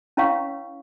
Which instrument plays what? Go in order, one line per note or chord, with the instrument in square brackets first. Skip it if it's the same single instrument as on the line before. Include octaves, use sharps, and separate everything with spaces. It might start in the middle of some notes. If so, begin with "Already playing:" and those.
[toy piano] C#4 E4 B4 C#5 F5 C#6